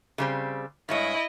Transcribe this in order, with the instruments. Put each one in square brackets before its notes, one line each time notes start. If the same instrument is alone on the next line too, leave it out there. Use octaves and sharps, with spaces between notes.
[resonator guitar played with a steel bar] C#3 G3 C4
[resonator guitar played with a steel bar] G2 G#3 C#5 [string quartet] E4 D#5